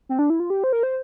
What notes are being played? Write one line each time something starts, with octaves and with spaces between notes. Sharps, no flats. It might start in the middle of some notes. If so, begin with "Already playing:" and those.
C4
D4
E4
F4
G4
C5
A#4
C5